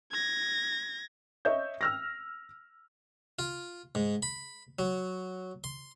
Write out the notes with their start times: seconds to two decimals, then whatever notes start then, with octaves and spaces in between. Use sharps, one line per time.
0.12 G#6 A#6
1.45 C#5 D#5 E5 G6
1.81 E6 F6 A#6
3.39 F4
3.95 G#2
4.23 B5
4.79 F#3
5.64 C6